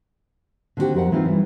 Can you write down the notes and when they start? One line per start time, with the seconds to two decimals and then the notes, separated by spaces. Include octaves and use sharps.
0.77 D3 D#3 C4 D4 F#4 G4
0.94 F2 A#4 F#5
1.12 E3 C4 D#4 F4
1.25 E3 G3